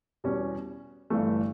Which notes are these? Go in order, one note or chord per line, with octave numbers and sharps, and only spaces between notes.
E2 B2 G3 C#4
G1 G2 E3 A3